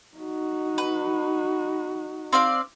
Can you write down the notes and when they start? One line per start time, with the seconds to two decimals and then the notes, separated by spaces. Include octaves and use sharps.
0.18 D#4 F#4
0.78 B4
2.33 C4 D5 F5